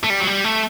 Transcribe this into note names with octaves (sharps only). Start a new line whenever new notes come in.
A3
G3
F#3
G3
A3